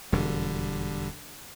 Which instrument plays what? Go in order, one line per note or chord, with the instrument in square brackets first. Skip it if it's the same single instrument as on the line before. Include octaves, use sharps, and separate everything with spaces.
[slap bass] E1 F2 [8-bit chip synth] D3 G3